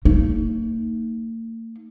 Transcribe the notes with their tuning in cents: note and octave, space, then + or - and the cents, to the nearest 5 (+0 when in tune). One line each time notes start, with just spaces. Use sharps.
A#3 -45 D#4 +0